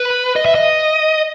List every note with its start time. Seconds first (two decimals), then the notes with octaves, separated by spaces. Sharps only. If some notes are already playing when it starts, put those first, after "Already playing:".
Already playing: B4
0.36 D#5
0.46 E5
0.55 D#5